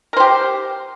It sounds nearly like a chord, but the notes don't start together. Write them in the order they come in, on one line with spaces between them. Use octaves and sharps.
A#4 C5 G4